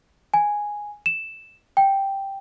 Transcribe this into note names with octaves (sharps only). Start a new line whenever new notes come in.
G#5
E7
G5